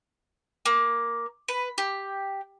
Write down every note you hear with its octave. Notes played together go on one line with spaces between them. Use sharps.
A#3
B4
G4